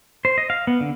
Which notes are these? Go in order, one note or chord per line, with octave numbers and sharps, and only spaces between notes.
C5
D#5
F5
B3
D3